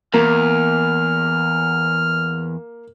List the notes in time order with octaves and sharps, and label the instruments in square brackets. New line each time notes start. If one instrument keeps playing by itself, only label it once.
[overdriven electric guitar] E2 [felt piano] A#3 [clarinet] F6